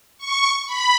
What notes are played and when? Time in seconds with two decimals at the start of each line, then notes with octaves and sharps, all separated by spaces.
0.18 C#6
0.66 B5